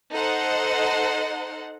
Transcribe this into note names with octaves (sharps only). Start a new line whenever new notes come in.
D#4 A4 C5 D#5 F#5